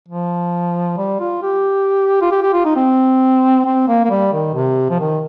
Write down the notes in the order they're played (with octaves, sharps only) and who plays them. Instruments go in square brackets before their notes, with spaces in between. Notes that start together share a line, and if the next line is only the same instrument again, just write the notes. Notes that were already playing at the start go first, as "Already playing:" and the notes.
[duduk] F3
G3
F4
G4
F4
G4
G4
F4
D#4
C4
C4
A#3
A#3
G3
D#3
C3
F3
D#3